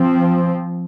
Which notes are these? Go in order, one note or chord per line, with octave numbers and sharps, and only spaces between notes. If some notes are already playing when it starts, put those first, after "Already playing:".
Already playing: F3 C4